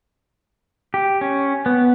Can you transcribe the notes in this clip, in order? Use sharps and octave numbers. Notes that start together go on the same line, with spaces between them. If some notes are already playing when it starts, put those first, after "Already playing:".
G4
C#4
B3